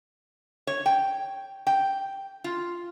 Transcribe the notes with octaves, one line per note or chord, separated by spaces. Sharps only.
C#5
G5
G5
F4